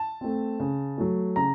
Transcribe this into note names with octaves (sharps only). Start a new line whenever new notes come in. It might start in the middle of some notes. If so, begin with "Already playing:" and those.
Already playing: A5
A3 C4
C#3
F#3 A3
C#3 A#5